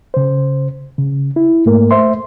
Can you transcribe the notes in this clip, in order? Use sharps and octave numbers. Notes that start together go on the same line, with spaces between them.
C#3 C5
C#3
E4
G#2 A3 A#3 A#4
A3 C5 E5 C6